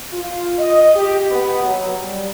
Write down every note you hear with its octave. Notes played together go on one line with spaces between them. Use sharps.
F4
D#5
G4
B3
F#3
G3